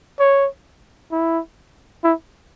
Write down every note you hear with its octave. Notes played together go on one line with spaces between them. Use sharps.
C#5
E4
E4